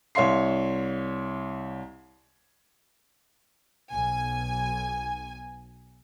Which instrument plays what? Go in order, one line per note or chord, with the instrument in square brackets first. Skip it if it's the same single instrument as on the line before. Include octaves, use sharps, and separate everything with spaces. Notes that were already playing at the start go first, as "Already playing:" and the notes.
[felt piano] C2 C#5 E5 F5 C6 C7
[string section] B1 G#5